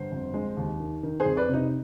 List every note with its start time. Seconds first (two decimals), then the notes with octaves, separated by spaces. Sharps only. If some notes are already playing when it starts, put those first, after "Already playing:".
Already playing: G1 C5
0.12 F2
0.34 G#3
0.57 D#2
0.80 D#3
1.03 D#3
1.20 G#4 C5
1.26 F2
1.37 B4 D5
1.49 C3 D#4